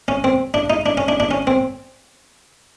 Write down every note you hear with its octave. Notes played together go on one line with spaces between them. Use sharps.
C#4
C4
D4
D#4
D4
C#4
D4
D4
C#4
C4